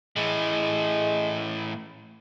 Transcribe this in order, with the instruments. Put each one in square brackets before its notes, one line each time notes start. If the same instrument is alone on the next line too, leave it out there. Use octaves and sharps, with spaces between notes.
[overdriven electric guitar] A2 E3 [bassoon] G#3